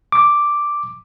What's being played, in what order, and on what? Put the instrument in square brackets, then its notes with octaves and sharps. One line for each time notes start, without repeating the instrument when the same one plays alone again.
[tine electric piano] D6